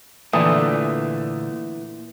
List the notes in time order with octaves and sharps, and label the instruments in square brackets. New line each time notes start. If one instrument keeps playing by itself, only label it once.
[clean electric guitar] A#2 D3 A3 [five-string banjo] E3 [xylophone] D5 D#6